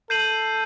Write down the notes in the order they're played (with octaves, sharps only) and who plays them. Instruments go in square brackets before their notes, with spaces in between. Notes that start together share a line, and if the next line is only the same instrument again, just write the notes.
[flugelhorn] A4 [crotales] G6 C7 D#7 F#7